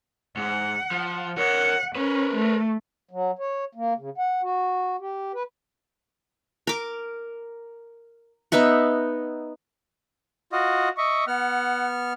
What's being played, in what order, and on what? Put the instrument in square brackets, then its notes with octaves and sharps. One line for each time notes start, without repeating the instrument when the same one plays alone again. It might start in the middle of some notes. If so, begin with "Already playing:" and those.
[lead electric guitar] G#2 [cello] F#5
[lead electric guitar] F3
[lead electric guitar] A#4 C#5 [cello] F#5
[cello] C#4 [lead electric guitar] A#4 B4
[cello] A3
[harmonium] F#3
C#5
A#3
C#3
F#5
F#4
G4
B4
[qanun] A#4 D6
B3 D#4 E5 F#5
[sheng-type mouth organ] F4 F#4 D#5
[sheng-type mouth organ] D#5 E5 [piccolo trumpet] C#6
[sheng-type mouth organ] B3 F6 [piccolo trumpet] F#5